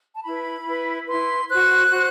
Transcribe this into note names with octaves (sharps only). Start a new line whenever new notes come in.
A5
E4 B4 B5
E4 B4
E4 B4 C6
F#4 C5 F#6
F#4 C5